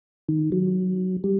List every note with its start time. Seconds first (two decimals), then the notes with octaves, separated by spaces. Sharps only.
0.29 D#3
0.52 F#3
1.24 G3